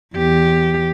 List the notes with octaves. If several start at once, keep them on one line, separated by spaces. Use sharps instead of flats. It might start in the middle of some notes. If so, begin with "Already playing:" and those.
E2 G4